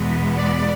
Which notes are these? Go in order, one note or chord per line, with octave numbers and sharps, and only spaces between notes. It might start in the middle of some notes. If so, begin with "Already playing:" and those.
Already playing: E2 B2 G#3 B3
D5